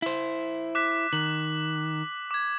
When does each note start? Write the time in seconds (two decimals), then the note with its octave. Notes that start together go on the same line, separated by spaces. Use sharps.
0.02 E4 C5
0.75 D6 F#6 B6
1.13 D#3 F#7
2.31 D6 G#6